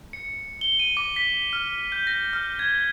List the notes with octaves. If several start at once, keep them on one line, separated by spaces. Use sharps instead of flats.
C#7
G7
D#7
D6
B6
F6
G6
A#6
F6
G#6